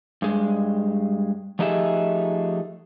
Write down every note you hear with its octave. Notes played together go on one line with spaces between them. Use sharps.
G2 G#3
F3 A3 D#4 G4 G#4 E5